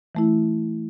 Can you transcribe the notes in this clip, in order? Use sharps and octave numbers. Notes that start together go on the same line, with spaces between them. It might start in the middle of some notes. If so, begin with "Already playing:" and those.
E3 A3 E4